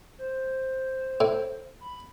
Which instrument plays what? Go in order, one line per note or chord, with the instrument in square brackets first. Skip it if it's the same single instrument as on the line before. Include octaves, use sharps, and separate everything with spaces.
[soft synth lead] C5
[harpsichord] A2
[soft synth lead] B5